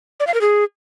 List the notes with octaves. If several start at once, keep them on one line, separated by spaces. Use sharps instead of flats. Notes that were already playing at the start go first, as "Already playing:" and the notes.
D5
F5
A#4
G#4